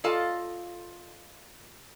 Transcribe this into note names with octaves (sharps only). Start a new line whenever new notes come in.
F4 A4 D5 D#5 F5 A5